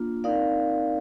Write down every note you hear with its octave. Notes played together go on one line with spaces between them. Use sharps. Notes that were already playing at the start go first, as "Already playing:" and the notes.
Already playing: A#3 D4 F4
C4 D#4 A#4 D5 F5